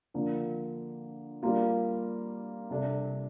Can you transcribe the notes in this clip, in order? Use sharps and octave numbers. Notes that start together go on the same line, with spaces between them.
D3 F3 A#3
G3 A#3 F4
C3 G3 D4 A4